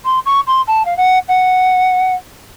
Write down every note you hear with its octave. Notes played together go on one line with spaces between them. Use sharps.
C6
C#6
C6
A5
F5
F#5
F#5